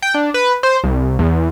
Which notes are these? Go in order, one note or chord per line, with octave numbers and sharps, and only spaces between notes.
G5
D4
B4
C5
C2
E2